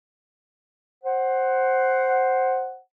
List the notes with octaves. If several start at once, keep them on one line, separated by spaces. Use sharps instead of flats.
C5 F#5